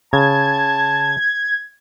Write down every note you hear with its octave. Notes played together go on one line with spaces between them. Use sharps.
C#3 A5 G#6